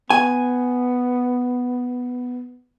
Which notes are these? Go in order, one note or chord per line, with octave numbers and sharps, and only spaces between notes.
B3 G#5